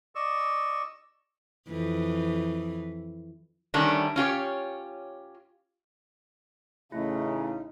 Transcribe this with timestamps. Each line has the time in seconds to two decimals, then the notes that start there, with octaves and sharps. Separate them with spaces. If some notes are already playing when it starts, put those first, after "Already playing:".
0.15 D5 D#5 C#6 E6
1.69 F2 E3
3.74 D3 D#3 G3 A3 C#4 D4
4.16 C#4 F4 G4 C#5
6.92 A1 C#3 A3 D#4 E4